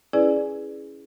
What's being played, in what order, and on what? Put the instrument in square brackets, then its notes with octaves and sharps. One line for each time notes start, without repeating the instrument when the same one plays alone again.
[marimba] C#4 E4 G#4 B4 D5 G#5